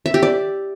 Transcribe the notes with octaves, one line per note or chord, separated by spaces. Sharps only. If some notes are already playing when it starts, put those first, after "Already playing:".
E5
G4
D5